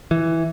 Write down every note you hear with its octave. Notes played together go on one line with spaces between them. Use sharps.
E3